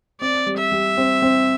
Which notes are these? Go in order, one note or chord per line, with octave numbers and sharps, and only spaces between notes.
C4 D5
G3
E5
G3
C4
C4